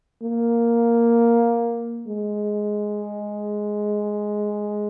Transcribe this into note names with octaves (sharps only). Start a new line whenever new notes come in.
A#3
G#3